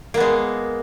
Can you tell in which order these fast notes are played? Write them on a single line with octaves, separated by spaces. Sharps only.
A#3 B3 G#3